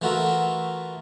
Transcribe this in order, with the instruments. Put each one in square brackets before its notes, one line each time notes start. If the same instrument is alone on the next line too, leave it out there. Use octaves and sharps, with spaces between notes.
[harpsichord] E3 A3 F4 F#4 A#4 E5